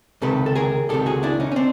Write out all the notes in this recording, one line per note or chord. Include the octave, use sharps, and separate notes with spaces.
C#2 C3 D#3 A4 B4
A4
G#4 A#4
C#2 C3 D#3 G4 A4
F#4 G#4
D4 E4
C#4 D#4
C#4
C4 D4